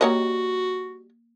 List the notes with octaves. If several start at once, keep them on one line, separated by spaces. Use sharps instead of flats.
G3 A#3 F#4 C#5 D#5 A#5